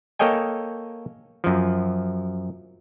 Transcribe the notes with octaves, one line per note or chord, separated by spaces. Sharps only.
A#3 A4 C#5 D#5 G5 G#5
F#2 F3